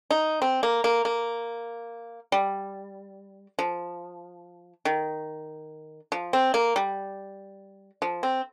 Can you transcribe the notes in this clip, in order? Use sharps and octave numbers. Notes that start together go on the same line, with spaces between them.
D#4
C4
A#3
A#3
A#3
G3
F3
D#3
F3
C4
A#3
G3
F3
C4